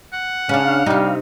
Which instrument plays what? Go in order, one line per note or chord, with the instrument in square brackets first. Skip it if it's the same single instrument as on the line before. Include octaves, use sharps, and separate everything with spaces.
[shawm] F#5
[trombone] C#3 [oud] C#4 D4 [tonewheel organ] F5
[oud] C3 D#4 [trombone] G3